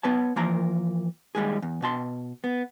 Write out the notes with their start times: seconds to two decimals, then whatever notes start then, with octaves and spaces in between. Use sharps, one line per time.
0.03 B3 B4 C#5 A5
0.36 E3 F3 A#3 A#4 A#5
1.35 D#2 G3 G#3 G#4
1.62 E2
1.82 B2 A5 C6
2.44 B3